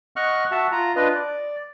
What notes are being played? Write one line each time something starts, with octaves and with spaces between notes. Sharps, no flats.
D#5 F#5 C#6 F6 F#6
F#4 E5 F#5 A5
F4 A#5
D4 F4 B4 D#5
D5